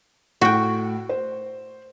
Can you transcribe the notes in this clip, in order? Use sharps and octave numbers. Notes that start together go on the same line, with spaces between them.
A2 F#4 G5
C5